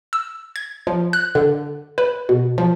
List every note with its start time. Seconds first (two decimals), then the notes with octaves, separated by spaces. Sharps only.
0.13 E6
0.56 G#6
0.87 F3
1.13 F#6
1.35 D3
1.98 B4
2.29 B2
2.58 F3